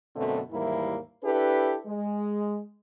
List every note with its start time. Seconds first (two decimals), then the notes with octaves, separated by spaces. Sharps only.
0.16 F#2 B2 D3 F#3 A3 C4
0.51 D#2 G#2 E3 G3 A#3 E4
1.24 D4 E4 G4 A4 B4
1.87 G#3